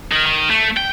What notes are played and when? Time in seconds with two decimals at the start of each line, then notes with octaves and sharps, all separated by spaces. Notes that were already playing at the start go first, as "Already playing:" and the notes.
0.12 D#3
0.26 D#3
0.50 A3
0.77 G5